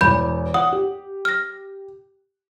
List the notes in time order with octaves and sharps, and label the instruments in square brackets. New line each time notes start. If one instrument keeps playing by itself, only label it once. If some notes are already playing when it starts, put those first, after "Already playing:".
[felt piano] E1 E2 [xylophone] B5 G6
[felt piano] F#5 [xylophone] D#6
[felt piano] G4
[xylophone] F6 A#6